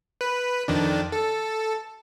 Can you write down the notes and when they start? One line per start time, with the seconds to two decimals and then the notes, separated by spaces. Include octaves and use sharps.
0.21 B4
0.68 F2 D#3 D4
1.12 A4